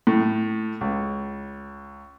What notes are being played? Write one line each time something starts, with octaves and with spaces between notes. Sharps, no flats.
A2
C#2